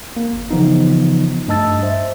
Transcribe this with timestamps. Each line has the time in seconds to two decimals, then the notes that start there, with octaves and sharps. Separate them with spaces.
0.17 A#3
0.33 G1
0.51 C#3 E3 F3 B3 D#4
1.48 G2 A3 D#5 A5 E6 A6
1.83 C5 E5